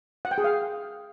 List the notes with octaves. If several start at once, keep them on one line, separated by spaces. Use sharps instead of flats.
F#5
G5
G#4
F5